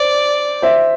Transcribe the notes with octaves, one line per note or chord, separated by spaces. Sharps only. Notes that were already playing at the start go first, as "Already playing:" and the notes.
Already playing: C5 D5
C5 E5